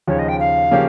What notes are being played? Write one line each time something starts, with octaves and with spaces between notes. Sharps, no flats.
D#2 C#3 F3 C#5
D#5
G5
F5
C#3 F3 A#3 C#4 G4